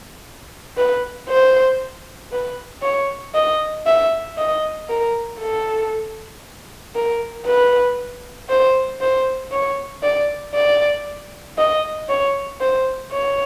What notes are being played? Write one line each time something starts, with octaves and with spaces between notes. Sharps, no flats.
B4
C5
B4
C#5
D#5
E5
D#5
A#4
A4
A#4
B4
C5
C5
C#5
D5
D5
D#5
C#5
C5
C#5